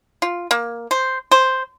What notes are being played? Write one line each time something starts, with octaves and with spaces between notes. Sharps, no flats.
F4
A#3
C5
C5